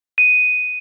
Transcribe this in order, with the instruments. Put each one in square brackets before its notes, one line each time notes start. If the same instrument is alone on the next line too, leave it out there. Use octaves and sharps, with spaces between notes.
[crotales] D#7